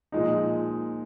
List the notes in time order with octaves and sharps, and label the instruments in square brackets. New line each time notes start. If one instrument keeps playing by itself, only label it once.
[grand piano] A#2 F3 G#3 D#4